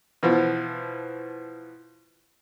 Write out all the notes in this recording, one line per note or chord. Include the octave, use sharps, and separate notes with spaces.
B2 E3 F3